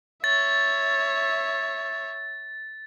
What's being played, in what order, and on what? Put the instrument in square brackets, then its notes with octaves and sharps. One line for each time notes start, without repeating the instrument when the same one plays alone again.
[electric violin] C#5 E5 [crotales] A6